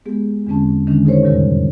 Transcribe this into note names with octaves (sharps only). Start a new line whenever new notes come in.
G#3 B3 G4 G#4
E2 D3 G#3 C4 C#4 A5
D3 D#3 G#3 A3 C#4 D4
D#4 G#4 A#4 C5 C#5
F2 A2 C3 D#3 G3 A#4